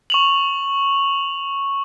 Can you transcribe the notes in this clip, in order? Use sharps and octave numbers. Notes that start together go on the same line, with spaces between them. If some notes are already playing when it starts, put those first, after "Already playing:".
C#6 F7 F#7